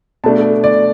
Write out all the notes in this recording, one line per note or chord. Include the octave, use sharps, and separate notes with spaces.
B2 A3 D4 A5
D5